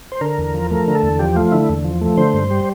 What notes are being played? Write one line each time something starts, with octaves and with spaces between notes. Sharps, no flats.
C5
D3 A#4
E2
F3
A3 A#4
D3
A4
E2
F3 G4
A3 F4
D3 E4
E2
F3
A3
D3 C5
G2
G3